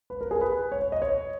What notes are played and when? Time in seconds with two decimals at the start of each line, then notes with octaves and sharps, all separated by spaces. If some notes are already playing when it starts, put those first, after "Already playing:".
0.10 B4
0.21 A#4
0.31 G#4
0.41 B4
0.72 C#5
0.82 C#5
0.92 D#5
1.02 C#5